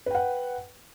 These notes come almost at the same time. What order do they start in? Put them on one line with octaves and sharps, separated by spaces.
B4 G5 F#5